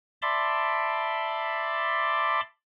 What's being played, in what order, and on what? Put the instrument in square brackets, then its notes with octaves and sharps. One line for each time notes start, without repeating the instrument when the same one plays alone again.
[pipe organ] D5 E5 A5 B5 C6 D6